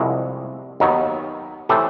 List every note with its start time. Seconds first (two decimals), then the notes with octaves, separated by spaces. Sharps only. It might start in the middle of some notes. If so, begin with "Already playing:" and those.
Already playing: C2 C3 F3 G#3 E4 F#4
0.80 D#2 D#3 F#3 B3
1.69 A2 E3 A3 C4 G4 A4